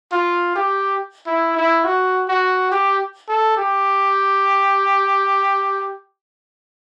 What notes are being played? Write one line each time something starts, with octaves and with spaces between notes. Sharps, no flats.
F4
G4
E4
E4
F#4
F#4
G4
A4
G4